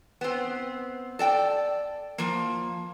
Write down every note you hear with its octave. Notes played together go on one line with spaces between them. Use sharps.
B3 C4
A4 D5 G5
F3 A#3